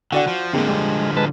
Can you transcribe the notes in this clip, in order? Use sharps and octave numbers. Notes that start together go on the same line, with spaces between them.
D3 F#4 D5 F#5
F3
D3 F3 G#3 A#3 C4
G3 G#3
G#3 B4 A5